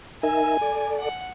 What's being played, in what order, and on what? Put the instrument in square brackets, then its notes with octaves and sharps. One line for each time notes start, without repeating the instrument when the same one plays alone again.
[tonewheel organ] D#4 A#4 E5 [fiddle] G#5
[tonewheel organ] A4 D5
[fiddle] F#5